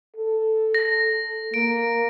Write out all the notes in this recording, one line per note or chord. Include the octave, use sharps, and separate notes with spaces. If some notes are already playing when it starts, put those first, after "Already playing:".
A4
A#6
A#3 D7